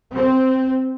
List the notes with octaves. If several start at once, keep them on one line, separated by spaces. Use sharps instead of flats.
C4